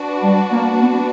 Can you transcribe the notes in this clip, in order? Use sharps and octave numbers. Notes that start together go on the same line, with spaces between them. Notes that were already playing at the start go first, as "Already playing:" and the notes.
Already playing: D4 F#4 B4
G3
A#3
B3